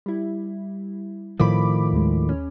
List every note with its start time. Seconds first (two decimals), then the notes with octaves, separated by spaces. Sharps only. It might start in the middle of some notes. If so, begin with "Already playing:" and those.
0.06 G3 E4
1.39 A2 D#3 F3 B5 D6
1.93 D#2 G#3
2.29 C#4